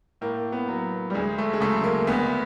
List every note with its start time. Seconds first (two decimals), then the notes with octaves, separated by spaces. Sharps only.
0.21 A2 A#3
0.52 B3
0.68 F#3
1.10 G3
1.14 D2 G#3
1.38 A3
1.53 G#3
1.60 C#3 F#3 A3
1.84 A#3
2.07 D2 B3